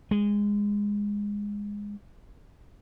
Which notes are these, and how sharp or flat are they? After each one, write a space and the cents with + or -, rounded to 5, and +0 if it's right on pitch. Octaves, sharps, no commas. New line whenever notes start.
G#3 -15